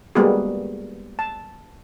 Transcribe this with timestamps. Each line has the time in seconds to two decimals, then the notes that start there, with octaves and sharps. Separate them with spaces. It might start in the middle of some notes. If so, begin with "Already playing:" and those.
0.15 G3 G#3 A#3 B3 F#4 G#4
1.19 A5